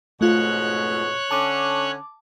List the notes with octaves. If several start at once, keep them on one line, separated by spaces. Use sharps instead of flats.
F2 G#2 B2 A3 F4 C#5 F#6
D3 C#4 A5 D6